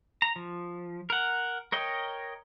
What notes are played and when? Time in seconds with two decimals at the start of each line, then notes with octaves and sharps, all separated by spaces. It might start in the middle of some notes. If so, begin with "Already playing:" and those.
0.22 A#5
0.36 F3
1.10 A#4 F#5
1.72 A#4 C#5 D#5 G5